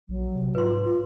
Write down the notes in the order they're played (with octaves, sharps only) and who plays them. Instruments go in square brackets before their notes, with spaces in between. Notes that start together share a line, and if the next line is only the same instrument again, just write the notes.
[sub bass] A#1 [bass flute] F#3
[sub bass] C3
[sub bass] G#2 [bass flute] F4 [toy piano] B4 C6
[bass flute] F4